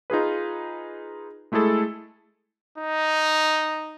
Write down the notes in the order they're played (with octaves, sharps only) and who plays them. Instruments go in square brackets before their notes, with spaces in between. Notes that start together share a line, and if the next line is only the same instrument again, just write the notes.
[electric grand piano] D#4 F4 G#4 B4
G#3 A3 E4 G#4 A4
[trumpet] D#4